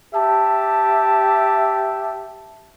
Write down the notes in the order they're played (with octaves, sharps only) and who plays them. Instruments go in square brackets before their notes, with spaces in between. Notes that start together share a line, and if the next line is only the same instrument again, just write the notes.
[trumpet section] G4 E5 A5